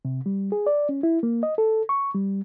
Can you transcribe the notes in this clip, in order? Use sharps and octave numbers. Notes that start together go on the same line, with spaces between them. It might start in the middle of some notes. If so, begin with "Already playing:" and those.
C3
G3
G#4
D5
C#4
E4
A#3
D#5
A4
C#6
G3